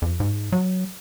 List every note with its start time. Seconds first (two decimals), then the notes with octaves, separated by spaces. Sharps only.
0.02 F2
0.20 G#2
0.52 F#3